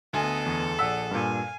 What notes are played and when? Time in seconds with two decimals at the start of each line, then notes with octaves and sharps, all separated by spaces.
0.13 D2 B3 A4 D#5 G#5
0.46 E2
0.79 A#1 G#4 D5 F#5 E6 B6
1.11 G2 A#2 F5 G#5